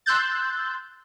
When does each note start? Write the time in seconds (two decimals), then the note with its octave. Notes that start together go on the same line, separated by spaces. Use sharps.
0.06 C6 E6 F#6 G6 A6